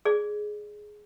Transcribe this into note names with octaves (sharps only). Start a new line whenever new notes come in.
G#4 D5